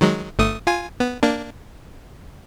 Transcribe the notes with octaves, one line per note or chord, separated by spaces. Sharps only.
D#3 F#3 G#3
G1 A3 D#6
F4 G#5
B3
A#3 D4